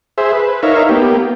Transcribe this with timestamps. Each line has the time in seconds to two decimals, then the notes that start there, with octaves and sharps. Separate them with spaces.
0.18 G#4 C5 E5
0.32 B4
0.63 D#4 A#4 C#5 E5 F5
0.89 A#3 B3 G4